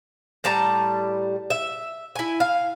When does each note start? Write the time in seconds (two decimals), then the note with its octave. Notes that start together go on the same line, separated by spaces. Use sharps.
0.44 A2 G3 A5 A#5
1.50 E5
2.15 E4 G#5
2.40 F5